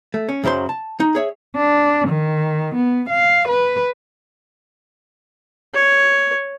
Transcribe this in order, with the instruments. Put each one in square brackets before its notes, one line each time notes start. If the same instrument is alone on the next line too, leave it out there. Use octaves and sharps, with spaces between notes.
[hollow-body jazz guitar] A3
C#4
F#2 C#3 F#3 C5 C6
A5
D#4
G#4 C#5 E5
[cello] D4
D#3
B3
F5
B4
[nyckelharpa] C#5